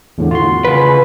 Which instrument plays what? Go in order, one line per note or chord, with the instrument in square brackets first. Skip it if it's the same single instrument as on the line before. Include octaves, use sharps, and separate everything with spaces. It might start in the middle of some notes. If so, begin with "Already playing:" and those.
[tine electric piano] E2 A2 D3
F4 F#4 C6
[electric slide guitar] C#3 B4